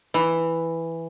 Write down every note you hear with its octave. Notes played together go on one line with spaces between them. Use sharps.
E3